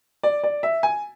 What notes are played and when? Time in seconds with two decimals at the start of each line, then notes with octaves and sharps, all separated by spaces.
0.23 D5
0.44 D5
0.63 E5
0.83 G#5